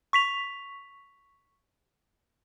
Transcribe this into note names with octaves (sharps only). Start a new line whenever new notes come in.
C#6 B6 F7